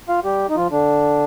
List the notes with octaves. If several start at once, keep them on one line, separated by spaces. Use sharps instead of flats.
F4 F5
G3 G4
D#4
F3 F4
D3 D4